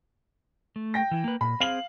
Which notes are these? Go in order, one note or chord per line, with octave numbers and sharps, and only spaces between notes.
A3
G5 A#6
E3 E4
A#3 B4
A#2 B5
C4 G#4 C5 F5 F#7